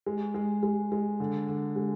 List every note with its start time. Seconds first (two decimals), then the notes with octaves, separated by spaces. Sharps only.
0.06 G#3
0.34 G#3
0.63 G#3
0.92 G#3
1.20 D3
1.49 D3
1.76 G#3